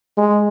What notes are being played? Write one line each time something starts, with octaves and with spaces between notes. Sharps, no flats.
G#3